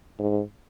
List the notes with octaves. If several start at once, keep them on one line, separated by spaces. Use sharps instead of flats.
G#2